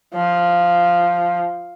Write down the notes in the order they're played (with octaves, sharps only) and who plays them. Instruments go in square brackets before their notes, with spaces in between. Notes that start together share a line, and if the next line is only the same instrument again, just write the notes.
[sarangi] F3